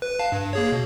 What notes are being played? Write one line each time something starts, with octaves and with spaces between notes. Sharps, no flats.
B4
F5 A5
G2
A#3 G#4 C#5
B2